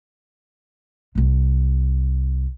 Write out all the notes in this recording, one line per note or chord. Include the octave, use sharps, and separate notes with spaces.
C2 C3